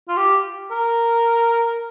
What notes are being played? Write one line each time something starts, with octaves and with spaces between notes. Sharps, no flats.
F4
G4
A#4